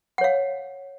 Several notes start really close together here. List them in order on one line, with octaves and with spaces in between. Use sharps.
F#5 C#5 F5